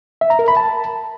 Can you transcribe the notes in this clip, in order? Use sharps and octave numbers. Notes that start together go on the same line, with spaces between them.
E5
A#5
A#4
B5
A5